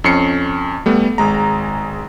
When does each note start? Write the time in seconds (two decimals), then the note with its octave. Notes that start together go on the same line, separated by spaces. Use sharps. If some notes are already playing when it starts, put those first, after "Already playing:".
0.04 F2 C#4 C7 C#7
0.86 G3 A3 B3
1.18 G#1 G#3 A#5